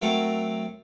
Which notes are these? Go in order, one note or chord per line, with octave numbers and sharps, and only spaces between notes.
F#3 A3 C4 A4 A#4